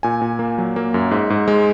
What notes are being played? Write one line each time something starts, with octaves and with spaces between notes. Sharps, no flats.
A#2 G#5
A#2
A#3
F#3
A#3
F#2
G#2
G#2
G#3